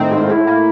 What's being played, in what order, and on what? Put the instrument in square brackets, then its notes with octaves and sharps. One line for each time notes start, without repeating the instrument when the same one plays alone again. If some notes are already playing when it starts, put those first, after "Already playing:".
Already playing: [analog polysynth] A2 D#3 C4
G#2
[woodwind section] F4
[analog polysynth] A2 [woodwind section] E4
[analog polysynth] A#3